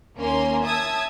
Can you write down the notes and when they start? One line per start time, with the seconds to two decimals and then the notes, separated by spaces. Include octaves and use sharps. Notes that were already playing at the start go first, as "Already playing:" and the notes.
0.17 D#2 A#3 C#4 G#5 C6
0.64 E5 A5 D#6 E6 G#6